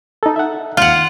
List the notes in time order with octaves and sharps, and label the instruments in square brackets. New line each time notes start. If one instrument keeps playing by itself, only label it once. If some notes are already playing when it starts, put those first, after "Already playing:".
[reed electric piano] D#4 A4
E5 F#5
[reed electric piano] D#2 F5 [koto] F4 F#5